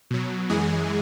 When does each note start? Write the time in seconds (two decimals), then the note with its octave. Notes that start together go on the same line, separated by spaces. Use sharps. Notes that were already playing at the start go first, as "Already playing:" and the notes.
0.10 B2 F#3
0.49 F#2 E3 G#3 G#4